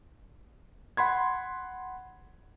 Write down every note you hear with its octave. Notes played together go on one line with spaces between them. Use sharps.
F#5 B5 C6 G#6